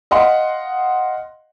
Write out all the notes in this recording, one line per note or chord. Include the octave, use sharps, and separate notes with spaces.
D#5 F5 F#5 C6